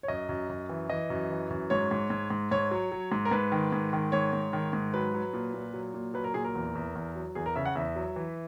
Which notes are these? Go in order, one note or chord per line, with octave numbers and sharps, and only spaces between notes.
C#5
F#2 D#5
F#2
F#2
E3
E3 D#5
F#2
E3
F#2
G#2 C#5
G#2
G#2
G#2
G#2 C#5
F#3
F#3
G#2
A#4
G#2 B4
D#3
G#2
D#3
G#2 C#5
G#2
D#3
G#2
F#3 B4
F#3
A#2
A#2
F#3
A#2
F#3 B4
A#4
A#2 G#4
A#4
E2
E2
E2
F#3
E2 G#4
A#4
C#3 E5
F#5
E2 E5
F#3
E3